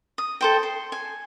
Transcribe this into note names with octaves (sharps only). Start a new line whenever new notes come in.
D#6
A4 C5 G5
C6
G#5